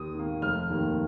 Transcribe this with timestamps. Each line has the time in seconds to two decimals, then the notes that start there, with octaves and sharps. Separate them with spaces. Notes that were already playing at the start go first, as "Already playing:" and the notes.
Already playing: D#2 D#6
0.15 D#3 A#3
0.42 F1 F6
0.70 D#2 D#3 A#3